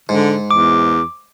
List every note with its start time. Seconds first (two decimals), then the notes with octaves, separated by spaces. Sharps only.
0.09 G#2 D3
0.51 E2 D6